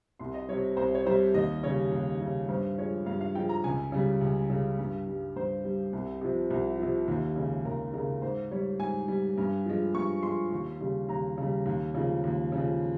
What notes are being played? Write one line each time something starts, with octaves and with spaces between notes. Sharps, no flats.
C2 C6
D#5
C3 G3 C#5
C2 C5
C#5
C3 G3 C5
D#2 D#5
C#3 G3 C#5
D#2
C#3 G3
G2 C5
F3 G#3 C#5
G2 F5
F5
F3 G#3 G5
A#5
C#2 G#5
C#3 G3
C#2
C#3 G3
G2
G3
G2 C5
G3
C2
C3 F3
C2
C3 F3
D#2
C#3 G#3
D#2 A#4
C#3 G#3 A#4
G#2 C5
G3 C#5
G#2 G#5
G3
G2
F3 G#3
G2 C#6
F3 G#3 C6
D#2
C#3 G3
D#2 A#5
C#3 G3
D#2
C#3 F3 G#3
D#2
C#3 F3 G#3